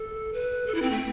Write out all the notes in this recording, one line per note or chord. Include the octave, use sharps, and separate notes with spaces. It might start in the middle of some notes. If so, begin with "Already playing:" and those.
Already playing: A4
B4
A4
E4
C4
A3